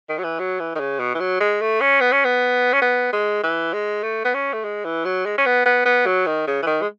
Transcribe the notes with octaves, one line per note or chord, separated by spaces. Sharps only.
D#3
F#3
E3
F#3
E3
D#3
C#3
B2
E3
F#3
G#3
A3
C#4
B3
C#4
B3
C#4
B3
G#3
E3
G#3
A3
B3
C#4
A3
G#3
E3
F#3
G#3
C#4
B3
B3
B3
F#3
D#3
C#3
E3
D#3
G#3